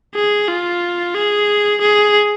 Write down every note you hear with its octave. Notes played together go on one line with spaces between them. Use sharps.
G#4
F4
G#4
G#4